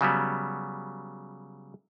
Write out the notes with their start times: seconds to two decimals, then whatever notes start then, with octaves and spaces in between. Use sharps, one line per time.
0.01 C#3 F#3 G3 B3